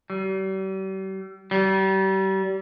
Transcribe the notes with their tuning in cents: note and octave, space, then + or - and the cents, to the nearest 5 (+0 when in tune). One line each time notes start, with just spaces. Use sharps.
G3 -40
G3 -35